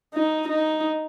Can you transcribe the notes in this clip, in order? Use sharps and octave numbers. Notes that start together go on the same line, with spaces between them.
D#4
D#4